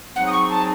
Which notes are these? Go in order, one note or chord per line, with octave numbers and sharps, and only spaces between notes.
F#3 C4 D#4 G#4 C#5 F#5
D#6
C#6
A5